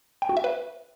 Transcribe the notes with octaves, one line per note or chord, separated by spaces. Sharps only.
G5
F#4
E5
B4